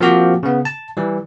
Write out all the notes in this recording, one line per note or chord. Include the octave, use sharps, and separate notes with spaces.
F3 A#3 C4 F#4 G4
C#3 B3
A5
E3 G3